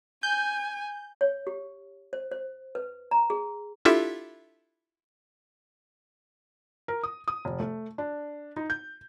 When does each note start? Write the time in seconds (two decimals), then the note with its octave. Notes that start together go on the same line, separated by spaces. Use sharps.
0.23 G#5 G6
1.21 C#5
1.47 G4
2.13 C5
2.32 C5
2.75 B4
3.11 A#5
3.30 G#4
3.85 D4 E4 F4 G4 A4 E5
6.88 A#4
7.03 D#6
7.28 D#6
7.45 F1
7.60 A3
7.98 D4
8.57 D#4
8.70 G6